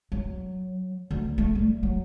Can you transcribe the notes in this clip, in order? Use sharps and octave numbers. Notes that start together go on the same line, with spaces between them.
F#3
D2
A3
G3
F#3